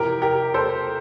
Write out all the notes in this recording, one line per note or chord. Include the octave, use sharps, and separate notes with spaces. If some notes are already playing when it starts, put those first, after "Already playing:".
Already playing: F2 C3 E3 G4 A#4
G4 A#4
A4 C5